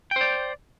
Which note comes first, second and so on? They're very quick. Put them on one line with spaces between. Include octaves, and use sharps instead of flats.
G5 C5 D5